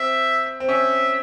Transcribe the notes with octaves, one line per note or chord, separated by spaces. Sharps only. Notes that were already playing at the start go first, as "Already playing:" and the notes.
Already playing: C4 E5
C4
C#4 E5